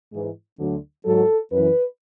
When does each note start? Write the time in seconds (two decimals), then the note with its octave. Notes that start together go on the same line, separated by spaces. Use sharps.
0.12 G#2 E3
0.59 D2 D3 F#3
1.05 G#2 F#3 A4
1.52 F#2 E3 B4